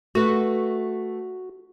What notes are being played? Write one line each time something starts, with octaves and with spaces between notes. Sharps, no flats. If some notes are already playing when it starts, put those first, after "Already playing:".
A3 F#4 B4